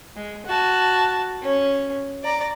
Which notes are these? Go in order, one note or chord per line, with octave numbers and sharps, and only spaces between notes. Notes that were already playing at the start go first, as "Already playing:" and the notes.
G#3
F#4 A5
C#4
D5 A#5